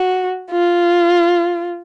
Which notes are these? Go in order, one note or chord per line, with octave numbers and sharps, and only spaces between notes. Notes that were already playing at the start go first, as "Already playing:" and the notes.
Already playing: F#4
F4